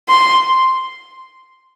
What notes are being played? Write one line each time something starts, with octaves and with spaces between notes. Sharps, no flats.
C6